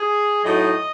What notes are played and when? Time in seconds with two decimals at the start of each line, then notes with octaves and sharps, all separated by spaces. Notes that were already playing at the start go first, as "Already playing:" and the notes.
Already playing: G#4
0.43 A2 F#3 A3 D#4 D#5